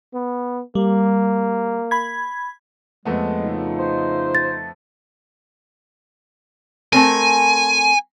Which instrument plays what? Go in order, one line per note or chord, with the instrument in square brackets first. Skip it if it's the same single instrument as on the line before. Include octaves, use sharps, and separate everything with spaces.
[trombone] B3
[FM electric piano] G3 [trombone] A#3
[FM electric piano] B5 G#6
[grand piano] F2 A3 B3 [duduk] G#3
[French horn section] C#3 D#4 F4
[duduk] C5
[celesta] A6
[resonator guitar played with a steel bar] A3 C4 A#4 [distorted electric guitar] G#5